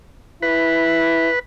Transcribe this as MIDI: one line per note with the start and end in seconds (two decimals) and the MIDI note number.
0.42 1.29 64
0.42 1.39 71